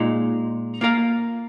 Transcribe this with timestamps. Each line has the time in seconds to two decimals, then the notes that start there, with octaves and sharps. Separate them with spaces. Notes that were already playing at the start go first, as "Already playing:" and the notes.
Already playing: A#2 G#3 D#4
0.81 A#3 F4 A#4 F5